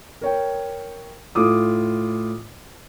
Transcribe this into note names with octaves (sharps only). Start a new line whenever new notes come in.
A#4 C#5 G5
A2 F4 D6 D#6